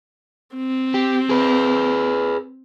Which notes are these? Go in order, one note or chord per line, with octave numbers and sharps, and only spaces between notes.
C4
G4
G#4 B4